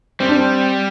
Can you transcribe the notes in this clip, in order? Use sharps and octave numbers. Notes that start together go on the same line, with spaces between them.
G3 C4
D4
C4